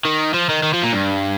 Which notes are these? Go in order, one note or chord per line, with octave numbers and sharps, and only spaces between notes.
D#3
F3
D#3
D#3
F3
A#2
G2